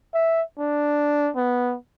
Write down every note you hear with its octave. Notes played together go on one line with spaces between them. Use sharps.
E5
D4
B3